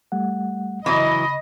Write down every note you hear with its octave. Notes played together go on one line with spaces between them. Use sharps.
G3 A3 F#5
C#3 E3 F#3 E4 D#5 B5 C#6